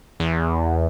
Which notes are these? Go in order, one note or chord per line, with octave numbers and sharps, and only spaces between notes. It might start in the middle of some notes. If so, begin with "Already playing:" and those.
E2